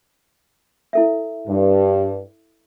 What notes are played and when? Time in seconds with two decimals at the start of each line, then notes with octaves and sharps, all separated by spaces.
0.93 E4 A4 E5
1.48 G2